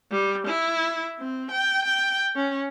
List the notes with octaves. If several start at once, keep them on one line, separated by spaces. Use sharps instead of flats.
G3
E4
C4
G5
G5
C#4